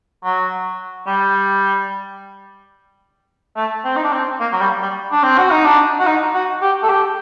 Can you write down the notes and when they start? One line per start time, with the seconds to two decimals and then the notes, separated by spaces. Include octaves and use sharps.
0.24 F#3
1.07 G3
3.56 A3
3.85 C4
3.96 D#4
4.04 D4
4.12 C4
4.40 A#3
4.52 F#3
4.60 G3
4.81 G3
5.12 D4
5.23 C4
5.38 F#4
5.51 D#4
5.65 D4
6.00 F#4
6.06 D#4
6.34 F#4
6.62 G4
6.83 A4
6.89 G4